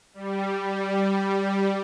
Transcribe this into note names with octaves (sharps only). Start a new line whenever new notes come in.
G3
G3